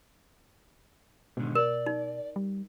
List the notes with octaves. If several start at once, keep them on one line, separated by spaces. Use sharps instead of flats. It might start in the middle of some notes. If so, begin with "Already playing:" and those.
G#2 B2 D3 D#3
A#4 D5
D#4
G3